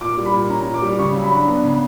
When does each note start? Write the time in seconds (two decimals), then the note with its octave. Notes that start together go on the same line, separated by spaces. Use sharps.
0.01 A#2 D6
0.17 G3
0.26 B5
0.34 A#2
0.50 C#4 A#5
0.66 A#2
0.74 D6
0.82 G3
0.99 C#3 C#6
1.15 F#3
1.24 B5
1.31 D4
1.47 B3
1.63 C#3